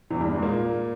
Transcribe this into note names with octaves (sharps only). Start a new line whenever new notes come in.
E2 E3
G2 G3
G#2 G#3
A#2 A#3